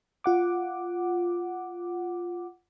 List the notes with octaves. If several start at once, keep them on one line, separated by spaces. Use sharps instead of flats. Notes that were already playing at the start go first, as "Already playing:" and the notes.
F4 F#5 D6